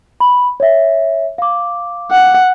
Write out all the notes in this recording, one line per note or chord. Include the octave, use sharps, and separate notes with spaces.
B5
C#5 E5
F5 D6
F#5